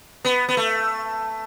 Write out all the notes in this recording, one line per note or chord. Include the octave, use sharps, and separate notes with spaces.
B3
B3
A3